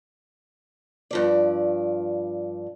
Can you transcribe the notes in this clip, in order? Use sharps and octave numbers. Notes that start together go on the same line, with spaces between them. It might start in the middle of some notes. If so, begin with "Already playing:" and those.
G2 F3 D5